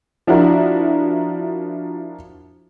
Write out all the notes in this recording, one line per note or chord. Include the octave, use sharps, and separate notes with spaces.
F3 D4 E4 F#4 A#4